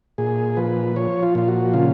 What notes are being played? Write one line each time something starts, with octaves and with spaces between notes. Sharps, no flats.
A#2 G#4
F3 B4
F3 C#5
F4
A#2 F4
F#4
C#3 F4